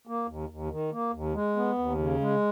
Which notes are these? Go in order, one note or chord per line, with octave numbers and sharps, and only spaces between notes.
A#3
D#2
D#2
D#3
A#3
D#2
G#3
B3
D#2
C#3
G#3